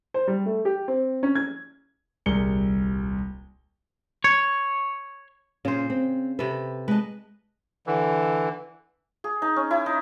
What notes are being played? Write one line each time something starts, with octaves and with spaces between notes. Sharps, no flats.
C5
G3
A3
G4
C4
C#4
G#6
D#1 C2 G#4 A#4 C#7 G7
C#5
A#2 C#3 C#4 C5
C4
C3 A4 B4
G#3 B4 D#5 A5
D3 E3
G#4
D#4
C#4
E4
D#4